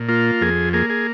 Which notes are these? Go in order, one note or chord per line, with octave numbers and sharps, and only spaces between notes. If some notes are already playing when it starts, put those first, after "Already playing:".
Already playing: A#2
A#3 F4
F2 G#4
A#3 G#4
G#4